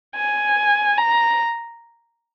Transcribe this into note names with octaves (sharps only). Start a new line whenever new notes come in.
G#5
A#5